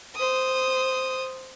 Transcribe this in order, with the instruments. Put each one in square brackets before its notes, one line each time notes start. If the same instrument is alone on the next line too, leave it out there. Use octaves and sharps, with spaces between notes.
[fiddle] C5 D#6